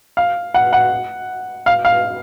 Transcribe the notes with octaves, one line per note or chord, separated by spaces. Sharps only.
F5
F#5
F#5
F5
F5